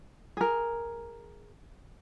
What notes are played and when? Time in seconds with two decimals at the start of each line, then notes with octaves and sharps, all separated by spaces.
0.37 G#4 A#4